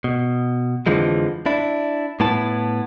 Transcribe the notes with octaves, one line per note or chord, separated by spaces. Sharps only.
B2
F2 D3 E3 F3 G#3
D4 E4
A2 B3 E4 A5